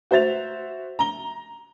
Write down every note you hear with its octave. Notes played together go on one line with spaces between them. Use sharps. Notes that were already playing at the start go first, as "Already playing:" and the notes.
F#4 C5 E5 A6 F7
A#5 G7